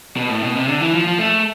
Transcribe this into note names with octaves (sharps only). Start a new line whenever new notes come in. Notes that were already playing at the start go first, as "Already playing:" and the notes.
B2
A2
B2
C3
D3
E3
F3
F3
A3